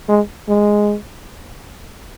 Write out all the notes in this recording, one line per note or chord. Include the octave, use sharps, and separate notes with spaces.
G#3
G#3